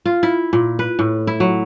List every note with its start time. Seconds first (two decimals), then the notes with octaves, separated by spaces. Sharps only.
0.06 F4
0.23 E4
0.53 A#2
0.79 B4
0.99 A2
1.27 E4
1.40 F#3